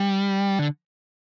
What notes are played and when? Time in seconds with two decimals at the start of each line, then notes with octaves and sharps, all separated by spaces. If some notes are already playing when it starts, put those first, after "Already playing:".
Already playing: G3
0.59 D3